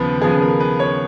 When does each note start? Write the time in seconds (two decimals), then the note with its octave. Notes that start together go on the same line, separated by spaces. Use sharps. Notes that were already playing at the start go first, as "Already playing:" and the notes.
Already playing: D#2 C#3 F3 B3 B4
0.21 D#2 C#3 F3 B3 G#4
0.41 A#4
0.60 B4
0.79 C#5